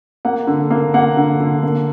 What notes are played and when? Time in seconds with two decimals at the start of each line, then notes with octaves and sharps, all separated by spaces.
0.25 A#3 F#5
0.47 D3
0.70 A#3
0.94 A#3 F#5
1.17 D3
1.40 D3
1.63 A#3